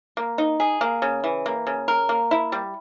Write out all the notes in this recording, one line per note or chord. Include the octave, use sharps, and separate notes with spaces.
A#3
D#4
G#4
A#3
C#3
E3
A#3
C#3
A#4
A#3
E4
G3